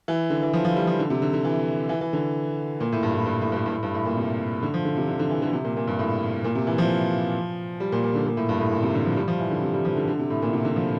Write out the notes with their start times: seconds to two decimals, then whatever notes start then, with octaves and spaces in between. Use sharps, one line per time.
0.08 E3
0.30 D3
0.42 E3
0.53 F3
0.65 F3
0.76 G3
0.87 F3
0.99 D3
1.10 C3
1.22 D3
1.33 D3
1.44 E3
1.89 E3
2.01 E3
2.13 D3
2.80 A#2
2.92 A2
3.03 G2
3.14 A2
3.26 G2
3.41 A2
3.52 G2
3.57 A2
3.66 G2
3.72 A2
3.83 G2
3.94 A2
4.05 A#2
4.17 C3
4.63 D3
4.74 F3
4.85 D3
4.97 C3
5.08 D3
5.19 D3
5.30 E3
5.42 D3
5.53 C3
5.64 A#2
5.77 A#2
5.87 G2
5.99 A2
6.44 A#2
6.55 C3
6.67 E3
6.78 F3
7.80 G3
7.92 A#2
8.03 A#2
8.15 D3
8.27 A#2
8.37 A2
8.49 G2
8.60 A2
8.71 A#2
8.83 C3
8.94 D3
9.06 F3
9.17 G3
9.28 F3
9.40 E3
9.51 D3
9.62 C3
9.74 G3
9.85 F3
9.96 D3
10.08 D3
10.19 C3
10.30 A2
10.42 A#2
10.53 C3
10.65 D3
10.76 F3